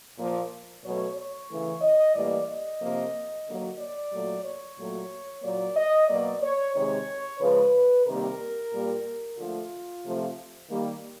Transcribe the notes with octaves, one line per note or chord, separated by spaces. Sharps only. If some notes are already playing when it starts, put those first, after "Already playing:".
A#2 F3 A#3
B2 F#3 A3 C#5
C#5
C#3 E3 A3
D#5
A2 E3 G3 A#3 D5
D#5
C3 F3 A#3
D3 F#3 A#3
D5
A#2 F#3 A3
C#5
A#2 F#3 A3
A#2 F#3 A#3 D5
D#5
B2 F#3 A#3 D5
C#5
C3 D#3 G#3 C#5
C#3 F3 G#3 B4
C3 D#3 G3 A#3 A#4
A#2 G3 A#3
D3 F3 A3 F4
C3 F3 A3
D#3 G3 A#3